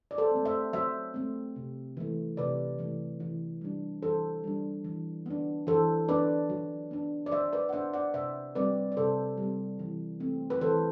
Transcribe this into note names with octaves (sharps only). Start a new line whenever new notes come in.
D5
A4 C5
A3 C4
C5 E5
F#3 C5 E5
A3 C4
C3
E3 A3
C3 B4 D5
E3 A3
E3
G3 D4
E3 A4 C5
G3 D4
E3
B3 D4
E3 A4 C5
B3 D4 B4 D5
F#3
B3 D4
D5
F#3 C5 E5
B4 D5
F#5
B3 D4 C5 E5
D5 F#5
C3 C5 E5
G3 C4 B4 D5
D5
C3 A4 C5
G3
C4
E3
A3 C4
B4
E3 A4 C5